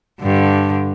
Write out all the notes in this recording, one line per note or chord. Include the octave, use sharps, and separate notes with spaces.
G2 D3